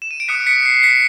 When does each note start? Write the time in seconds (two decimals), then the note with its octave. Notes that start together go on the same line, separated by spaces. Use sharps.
0.02 E7
0.11 D#7
0.20 D7
0.28 D#6 F#6 B6 C#7
0.47 B6 C#7
0.65 C7
0.83 B6 C#7